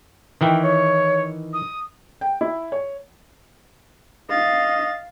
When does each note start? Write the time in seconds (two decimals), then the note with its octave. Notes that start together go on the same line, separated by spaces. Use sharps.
0.41 D#3 E3 E4 G5
0.62 C#5
1.53 D#6
2.21 G5
2.41 E4
2.72 C#5
4.30 D#5 F5 A6